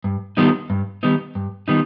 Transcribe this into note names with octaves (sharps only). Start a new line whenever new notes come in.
G2
D#3 G3 B3 D#4
G2
D#3 G3 B3 D#4
G2
D#3 G3 B3 D#4